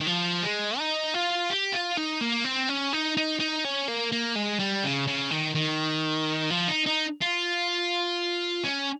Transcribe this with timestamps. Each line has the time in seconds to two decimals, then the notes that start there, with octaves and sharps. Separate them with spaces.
0.01 D#3
0.07 F3
0.42 G#3
0.78 D#4
1.14 F4
1.50 G4
1.73 F4
1.97 D#4
2.21 A#3
2.44 C4
2.69 C#4
2.93 D#4
3.17 D#4
3.40 D#4
3.65 C#4
3.88 A#3
4.12 A#3
4.36 G#3
4.60 G3
4.84 C#3
5.08 C#3
5.31 D#3
5.55 D#3
6.50 F3
6.68 D#4
6.86 D#4
7.21 F4
8.64 C#4